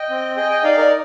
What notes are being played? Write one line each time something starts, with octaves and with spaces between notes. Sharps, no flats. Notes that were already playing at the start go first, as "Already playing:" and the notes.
Already playing: D#5 G5
C4
G#4 D#5 G5
D#5 G5
D#4 D5 F5
A#4 D5